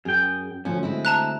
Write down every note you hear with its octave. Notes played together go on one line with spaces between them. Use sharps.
F#2 G#4 G5
D2 F3 C#4
G#3 C4 E4
A5 A#5 F#6